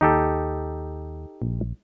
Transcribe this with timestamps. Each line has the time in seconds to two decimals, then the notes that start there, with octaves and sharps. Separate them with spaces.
0.01 D#2 D#4 G4 A4
1.42 A#1